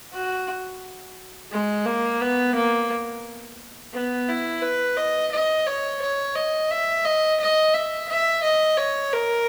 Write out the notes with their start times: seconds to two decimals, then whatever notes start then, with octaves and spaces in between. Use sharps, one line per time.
0.13 F#4
1.51 G#3
1.86 A#3
2.21 B3
2.55 A#3
3.93 B3
4.28 E4
4.62 B4
4.97 D#5
5.32 D#5
5.67 C#5
6.01 C#5
6.35 D#5
6.71 E5
7.05 D#5
7.40 D#5
7.74 E5
8.09 E5
8.43 D#5
8.78 C#5
9.13 A#4